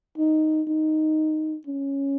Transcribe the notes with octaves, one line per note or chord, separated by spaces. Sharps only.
D#4
D#4
C#4